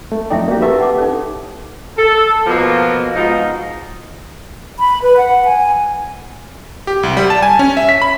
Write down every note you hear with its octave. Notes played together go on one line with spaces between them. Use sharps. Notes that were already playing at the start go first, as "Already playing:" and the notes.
A3
F2 D#4 D5 E5 G5
A#3 F#4 G4
E4 G4 A4 B4 E5 A5
F#5 D6
D#4 A4 C#5
A4
B2 F3 A#3
G#2 B2 F3 D#4
B5
B4
F#5
G#5
G4
C2
G3
A5
G#5
C#4
E5
B6
B5